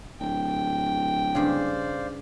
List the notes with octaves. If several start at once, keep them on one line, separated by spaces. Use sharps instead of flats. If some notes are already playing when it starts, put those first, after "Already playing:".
D1 G5
G2 C#3 C5 D5 F5